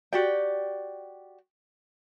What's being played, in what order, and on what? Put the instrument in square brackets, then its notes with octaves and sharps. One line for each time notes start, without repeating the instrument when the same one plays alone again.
[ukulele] F#4 G4 D5 G5